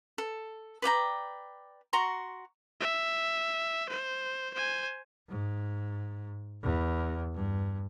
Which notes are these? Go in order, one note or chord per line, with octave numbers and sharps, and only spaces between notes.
A4
B4 D5 G5 A#5
F#4 A#5 C6 C#6
E5
C5
C5 G#5
G#2
E2
G2